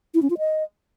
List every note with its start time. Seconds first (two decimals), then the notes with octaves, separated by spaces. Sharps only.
0.14 E4
0.22 C#4
0.30 F4
0.38 D#5